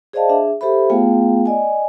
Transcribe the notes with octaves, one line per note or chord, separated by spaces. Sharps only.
G#4 C5 D5 D#5 F5 A5
D4 G#4 E5
G4 A4 C5 E5 B5
A3 B3 F4 G#4 F5 G5
D5 D#5 G#5